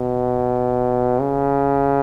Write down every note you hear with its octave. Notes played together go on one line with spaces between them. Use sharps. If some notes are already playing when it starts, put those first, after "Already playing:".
Already playing: B2
C#3